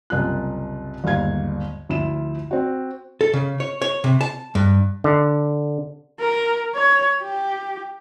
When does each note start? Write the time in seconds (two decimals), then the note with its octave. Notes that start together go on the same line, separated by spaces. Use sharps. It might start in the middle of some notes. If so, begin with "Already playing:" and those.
0.10 F#1 C2 F4 F#6
1.04 G1 D#2 G#2 F5 G#6
1.89 D2 F3 E4 F4 E7
2.51 C4 F#4
3.21 A4
3.33 C#3
3.60 C#5
3.82 C#5
4.04 C3
4.21 A5
4.55 G2
5.04 D3
6.20 A#4
6.74 C#5
7.22 G4